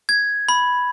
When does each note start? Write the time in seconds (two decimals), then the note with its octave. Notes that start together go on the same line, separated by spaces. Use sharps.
0.09 G#6
0.49 B5